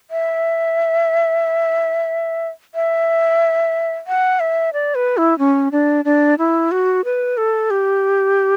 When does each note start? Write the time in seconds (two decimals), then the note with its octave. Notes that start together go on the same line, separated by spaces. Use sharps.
0.11 E5
2.75 E5
4.07 F#5
4.40 E5
4.73 D5
4.95 B4
5.17 E4
5.39 C#4
5.72 D4
6.05 D4
6.38 E4
6.71 F#4
7.05 B4
7.37 A4
7.71 G4